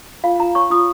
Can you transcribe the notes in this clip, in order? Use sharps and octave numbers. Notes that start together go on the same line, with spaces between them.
F4 F5
F4 A#5
C#5 C#6
F4 D#6